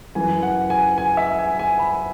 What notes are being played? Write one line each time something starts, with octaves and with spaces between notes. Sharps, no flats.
F#2 E3 G#5
F#5
G#5
G#5
E5
G#5
G#5
B5